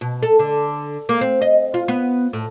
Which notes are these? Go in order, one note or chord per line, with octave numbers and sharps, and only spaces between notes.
B2
A4
D3
A#3
C4
D#5
F4
B3
A2